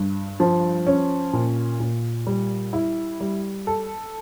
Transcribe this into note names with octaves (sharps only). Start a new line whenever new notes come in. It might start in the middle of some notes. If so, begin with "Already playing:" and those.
Already playing: G2
F3
C#4
A#2
A#2
G3
E4
G3
A4